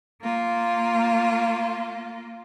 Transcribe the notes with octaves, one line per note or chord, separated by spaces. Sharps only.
A#3 F4